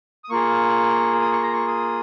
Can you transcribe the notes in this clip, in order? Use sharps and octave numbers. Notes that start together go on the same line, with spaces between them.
D#6
A#3 F4 G#4 C#6
D#6
C#6
A#5
C#6
D#6